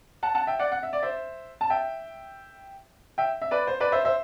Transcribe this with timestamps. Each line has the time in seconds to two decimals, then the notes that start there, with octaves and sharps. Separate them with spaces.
0.23 F#5 A5
0.35 F#5 A5
0.47 E5 G5
0.59 D5 F#5
0.72 F#5
0.83 E5
0.93 D5
1.03 C5 E5
1.61 A5
1.70 E5 G5
3.18 E5 G5
3.42 E5
3.51 B4 D5
3.67 C5
3.80 B4 D5
3.92 C5 E5
4.05 C5 E5